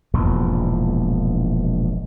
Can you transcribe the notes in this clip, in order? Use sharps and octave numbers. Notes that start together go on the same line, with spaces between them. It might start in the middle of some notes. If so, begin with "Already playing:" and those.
E1 A#1 E2 G#2